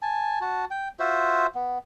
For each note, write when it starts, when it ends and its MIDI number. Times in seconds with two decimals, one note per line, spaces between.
0.02 0.39 80
0.02 0.39 81
0.41 0.65 66
0.41 0.65 81
0.71 0.89 79
1.00 1.46 65
1.00 1.46 66
1.00 1.46 72
1.00 1.46 76
1.55 1.78 59